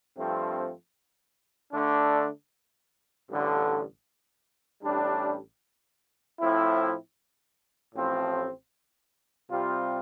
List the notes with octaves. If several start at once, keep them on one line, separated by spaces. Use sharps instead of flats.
G2 F3 A3 C4
D3 A3 D4
A1 G2 D3
A1 A2 G3 D4
A2 F3 C4 E4
A1 A2 F3 C4
C3 G3 C4 F4